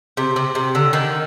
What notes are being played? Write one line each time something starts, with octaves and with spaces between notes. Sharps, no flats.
C3
C3
C3
D3
D#3